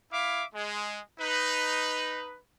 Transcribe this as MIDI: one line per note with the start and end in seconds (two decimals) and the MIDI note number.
0.12 0.44 64
0.12 0.44 76
0.12 0.44 77
0.12 0.44 86
0.54 0.98 56
1.20 2.39 63
1.20 2.39 71